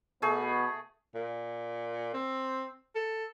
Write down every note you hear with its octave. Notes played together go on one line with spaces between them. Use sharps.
B2 A3 B3 G#4
A#2
C4
A4